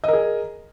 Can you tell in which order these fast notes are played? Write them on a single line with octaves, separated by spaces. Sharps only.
D#5 A#4 G#4